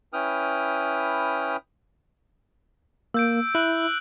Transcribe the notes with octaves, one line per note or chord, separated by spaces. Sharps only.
C#4 E4 B4 G5 D#6 F6
A#3 E6 G6 D7
E4 F#6 F#7